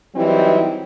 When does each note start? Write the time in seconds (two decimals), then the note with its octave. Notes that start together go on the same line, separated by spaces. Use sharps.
0.15 E3 F#3 G3 C4 D#4 E4